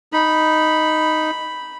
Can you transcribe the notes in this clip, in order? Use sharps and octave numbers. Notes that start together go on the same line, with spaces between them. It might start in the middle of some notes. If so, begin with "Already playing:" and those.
D#4 B5